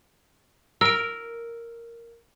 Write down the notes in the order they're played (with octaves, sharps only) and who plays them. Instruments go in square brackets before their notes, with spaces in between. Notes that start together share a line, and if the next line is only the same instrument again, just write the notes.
[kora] A#4 [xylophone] E6 D7